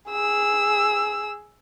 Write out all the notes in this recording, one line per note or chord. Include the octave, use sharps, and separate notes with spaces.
G#4 E6